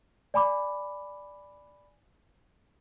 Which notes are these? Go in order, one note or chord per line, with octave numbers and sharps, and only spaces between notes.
D5 G#5 B5 D6